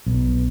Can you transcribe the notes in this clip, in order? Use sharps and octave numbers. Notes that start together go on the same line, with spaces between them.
B1